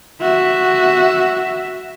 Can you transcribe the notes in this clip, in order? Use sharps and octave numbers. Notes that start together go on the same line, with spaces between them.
F#4 E5